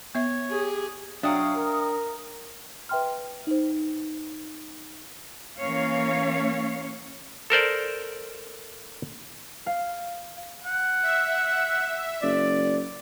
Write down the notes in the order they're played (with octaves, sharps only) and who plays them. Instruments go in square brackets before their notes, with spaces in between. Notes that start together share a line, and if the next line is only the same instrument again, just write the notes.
[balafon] B3 E5 [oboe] C#5
[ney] G4 [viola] G#4
[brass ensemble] F#3 F5 [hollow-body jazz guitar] D4 [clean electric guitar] E5 G5 [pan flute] D#6
[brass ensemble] A#4
[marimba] B4 E5 G5 C6 F6
D#4 C5
[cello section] E3 A#3 C#4 C#5 F5
[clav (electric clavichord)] A4 A#4 C5 D5
[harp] F5
[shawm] F#5
[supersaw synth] E5
[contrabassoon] F#1 [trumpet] D5